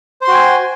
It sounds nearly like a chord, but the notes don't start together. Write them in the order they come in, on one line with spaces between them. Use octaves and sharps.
C5 C6 F#4 G5 G#5